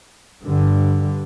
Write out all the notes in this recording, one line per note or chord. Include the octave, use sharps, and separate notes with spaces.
G2 D3